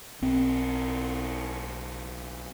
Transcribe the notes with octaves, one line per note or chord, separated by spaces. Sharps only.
B1 C4